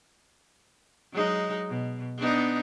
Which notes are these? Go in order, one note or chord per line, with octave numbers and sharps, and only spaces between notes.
F#3 G#3 D#4
B2
B3 D4 D#4